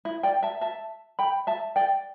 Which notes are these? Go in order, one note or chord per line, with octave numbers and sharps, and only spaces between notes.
E4
D5 G5
E5 A5
E5 A5
G5 B5
E5 A5
D5 G5